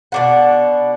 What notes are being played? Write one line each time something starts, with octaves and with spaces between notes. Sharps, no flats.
B2 D4 F#5